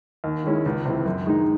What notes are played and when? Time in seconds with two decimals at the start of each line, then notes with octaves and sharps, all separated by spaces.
0.24 D#2
0.44 D#3 G#3 C#4 E4
0.66 C#2
0.85 C3 E3
1.05 F#2
1.26 D#3 G#3 D#4